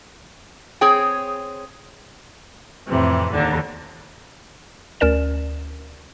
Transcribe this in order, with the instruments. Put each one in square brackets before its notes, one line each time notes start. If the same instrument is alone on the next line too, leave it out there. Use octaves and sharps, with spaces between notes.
[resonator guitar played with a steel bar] C4 G#4 C#5 G5
[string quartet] F2 A2 C3 E3
D#2 D3 D4
[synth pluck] D2 C#4 A#4 D5 E7